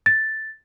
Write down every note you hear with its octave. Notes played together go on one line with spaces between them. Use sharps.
A6